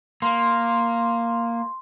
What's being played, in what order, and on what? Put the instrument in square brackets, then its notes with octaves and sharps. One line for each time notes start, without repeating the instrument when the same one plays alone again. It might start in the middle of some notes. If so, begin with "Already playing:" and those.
[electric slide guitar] A#3 [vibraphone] C6